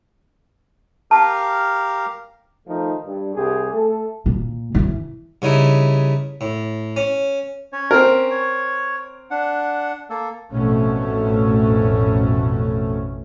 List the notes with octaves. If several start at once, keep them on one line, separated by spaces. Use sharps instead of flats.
G4 A#4 F5 A5
D#3 F3 A3 D#4
G2
C2 G4 G#4
A3 A4
A#2
D#3 E3
G2 C#3 D#4 E4
A2
C#4
C#4 C#5
C4 C#4 A#4
C#5
D4 F#5
A#3 A4
A1 F2 B2 A3 C#4